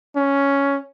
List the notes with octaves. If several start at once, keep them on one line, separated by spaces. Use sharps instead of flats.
C#4